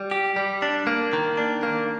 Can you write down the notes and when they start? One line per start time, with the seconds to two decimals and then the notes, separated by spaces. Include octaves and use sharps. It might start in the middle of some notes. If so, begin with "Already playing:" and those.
Already playing: G3
0.11 G4
0.36 G3
0.62 D4
0.87 A#3
1.13 D#3
1.37 D4
1.63 A#3